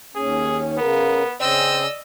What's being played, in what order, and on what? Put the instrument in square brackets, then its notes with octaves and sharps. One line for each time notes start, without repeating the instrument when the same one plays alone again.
[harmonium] D#2 C#4 [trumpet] G#4
[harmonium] C#3 [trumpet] B3 [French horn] A#4
[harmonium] C#3 C#4 [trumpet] C4 [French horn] D5 [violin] D#5 E6